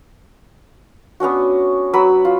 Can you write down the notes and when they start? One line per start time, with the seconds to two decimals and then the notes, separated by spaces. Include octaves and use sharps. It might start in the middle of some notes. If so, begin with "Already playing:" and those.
1.20 B3 C#4 D4 F#4
1.93 F#3 B4 B5 E6
2.25 F4